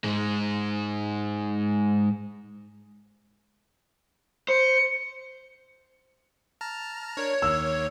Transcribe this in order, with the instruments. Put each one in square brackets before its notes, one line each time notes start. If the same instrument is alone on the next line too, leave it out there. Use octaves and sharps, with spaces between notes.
[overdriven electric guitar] G#2 G#3
[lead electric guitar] C5 [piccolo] C#7
[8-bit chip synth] A5 A#5 F6
[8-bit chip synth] D4 A#4 [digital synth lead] C#5
[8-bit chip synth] D#2 D#3 A#3 [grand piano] E6